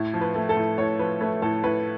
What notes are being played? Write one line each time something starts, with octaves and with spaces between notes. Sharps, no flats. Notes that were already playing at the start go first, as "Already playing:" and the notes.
Already playing: A2
F3
B4
A3
A4
A2
A2 C#5
F3 B4
A3 B4
A2 A4
A2 B4